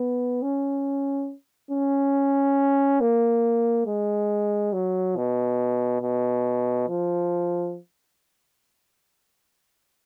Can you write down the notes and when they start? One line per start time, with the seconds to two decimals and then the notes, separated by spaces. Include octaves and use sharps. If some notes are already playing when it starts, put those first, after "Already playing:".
Already playing: B3
0.42 C#4
1.71 C#4
3.01 A#3
3.86 G#3
4.73 F#3
5.16 B2
6.02 B2
6.89 F3